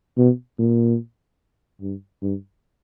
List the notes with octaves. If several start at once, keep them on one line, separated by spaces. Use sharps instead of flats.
B2
A#2
G2
G2